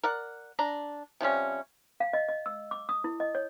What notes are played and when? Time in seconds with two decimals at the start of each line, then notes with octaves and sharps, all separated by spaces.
0.03 A#4 D5 F#5
0.59 D4 A#5
1.21 C3 F3 G3 C#4
2.00 F5
2.13 D#5
2.28 D#5
2.46 E6
2.71 D6
2.89 D#6
3.04 E4
3.20 D#5
3.35 C#5